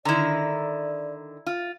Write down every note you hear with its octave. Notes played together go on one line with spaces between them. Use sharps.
D3 D#3 E4 D5 A#5
F4